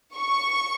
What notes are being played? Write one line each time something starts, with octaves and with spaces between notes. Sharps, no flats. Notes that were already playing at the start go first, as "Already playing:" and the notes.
C#6